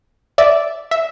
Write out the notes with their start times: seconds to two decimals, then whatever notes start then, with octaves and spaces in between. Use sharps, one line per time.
0.38 D5 E5
0.91 E5